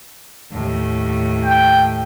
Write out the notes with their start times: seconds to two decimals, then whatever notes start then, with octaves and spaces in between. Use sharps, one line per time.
0.51 D#2 A2
1.45 G5